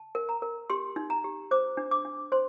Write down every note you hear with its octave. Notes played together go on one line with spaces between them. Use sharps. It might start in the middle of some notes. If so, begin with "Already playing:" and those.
Already playing: A5
A#4
A#5
A#4
G4 C6
D#4
A#5
G4
C5 D6
D4
D6
D4
C5 C6